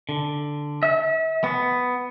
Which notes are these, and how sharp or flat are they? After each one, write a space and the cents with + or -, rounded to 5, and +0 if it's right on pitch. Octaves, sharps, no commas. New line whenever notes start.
D3 +0
E5 -35
B3 +5